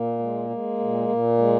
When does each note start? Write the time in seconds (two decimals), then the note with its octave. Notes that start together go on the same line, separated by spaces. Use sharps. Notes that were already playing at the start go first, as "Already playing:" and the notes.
Already playing: A#2 A#3
0.19 G#3
0.50 G#3
0.79 A#2
1.09 A#2
1.38 G#3